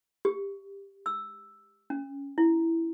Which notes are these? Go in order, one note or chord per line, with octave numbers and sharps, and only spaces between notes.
G4
E6
C#4
E4